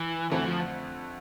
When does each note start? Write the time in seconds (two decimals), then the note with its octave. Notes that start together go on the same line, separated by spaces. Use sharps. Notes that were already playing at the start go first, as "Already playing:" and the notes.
Already playing: E3
0.31 F2 D3 E3 A3 C4
0.46 F3